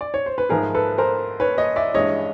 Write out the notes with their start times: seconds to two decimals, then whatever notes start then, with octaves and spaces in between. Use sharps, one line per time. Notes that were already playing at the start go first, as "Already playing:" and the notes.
0.01 D5
0.14 C#5
0.26 C5
0.38 B4
0.49 G#2 F3 A3 G#4 A#4
0.74 A4 B4
0.98 A#4 C5
1.40 B4 C#5
1.58 C#5 D#5
1.76 D5 E5
1.94 G2 E3 G#3 C#5 D#5